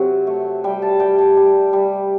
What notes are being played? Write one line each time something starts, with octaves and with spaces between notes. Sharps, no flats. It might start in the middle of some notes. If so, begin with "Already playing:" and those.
Already playing: C3 F#3 F#5
A3
G3 G5
A5
G3 G5
A5
G3
G3